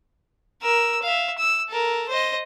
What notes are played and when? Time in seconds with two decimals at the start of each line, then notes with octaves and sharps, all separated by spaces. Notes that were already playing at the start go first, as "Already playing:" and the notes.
0.62 A#4 E6
1.03 E5 F5
1.38 E6
1.69 A4 A#4
2.08 C5 D#5